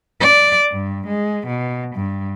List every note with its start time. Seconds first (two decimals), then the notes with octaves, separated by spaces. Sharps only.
0.21 D5
0.72 G2
1.07 G#3
1.47 B2
1.95 G2